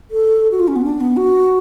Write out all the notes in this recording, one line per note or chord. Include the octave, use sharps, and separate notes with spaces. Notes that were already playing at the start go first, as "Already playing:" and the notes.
A4
F#4
F4
C#4
B3
D4
B3
F#4